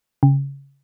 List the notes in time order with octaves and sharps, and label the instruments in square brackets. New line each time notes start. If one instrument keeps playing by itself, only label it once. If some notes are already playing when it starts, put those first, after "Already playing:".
[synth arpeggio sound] C#3